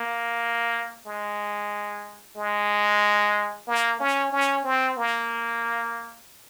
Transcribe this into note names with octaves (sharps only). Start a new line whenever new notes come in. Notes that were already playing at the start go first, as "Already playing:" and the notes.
Already playing: A#3
G#3
G#3
A#3
C#4
C#4
C4
A#3